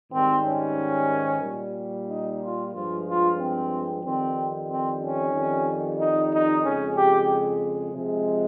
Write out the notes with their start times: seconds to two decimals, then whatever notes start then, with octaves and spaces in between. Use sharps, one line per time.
0.11 G#2 D#3 G3 C4
0.44 C#4
1.42 A#2 G3
2.07 D#4
2.39 F4
2.72 G2 F3 G#3 F4
3.05 F4
3.37 C4
4.02 F2 D#3 G3 C4
4.67 C4
5.00 C#4
5.33 F2 D#3 G3
5.98 D#4
6.31 D#4
6.63 F2 C#3 G#3 C#4
6.96 G4
7.94 C3 F3 G#3